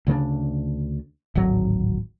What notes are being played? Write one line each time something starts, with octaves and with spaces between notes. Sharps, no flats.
D2 C#3 A3 D4
D1 G#1 F#3